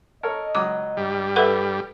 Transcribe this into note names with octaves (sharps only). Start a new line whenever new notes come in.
A4 A#4 C#5 D#5
C#2 F#3 D6 D#6
G2 G3
A4 B4 E5 F#5 B5